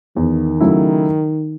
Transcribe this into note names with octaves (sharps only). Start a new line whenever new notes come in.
E2 D#3
C#3 F#3 A3 E4